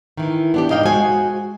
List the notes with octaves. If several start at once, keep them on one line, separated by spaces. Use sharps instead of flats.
D#3 E3
B3 D4 G4
G#2 A#3 D#4 D#5 F5 G5
G#3 F#4 C5 G#5